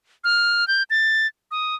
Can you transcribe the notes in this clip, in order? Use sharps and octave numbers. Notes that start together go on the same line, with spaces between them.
F6
G6
A6
D#6